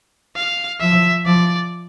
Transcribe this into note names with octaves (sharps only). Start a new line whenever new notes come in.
F5
F3 E5
F3 D5